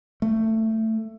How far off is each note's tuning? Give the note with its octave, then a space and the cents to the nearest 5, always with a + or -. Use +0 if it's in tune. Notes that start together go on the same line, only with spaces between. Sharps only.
A3 +15